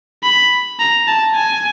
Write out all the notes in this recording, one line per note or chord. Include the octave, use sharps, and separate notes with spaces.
B5
A#5
A5
G#5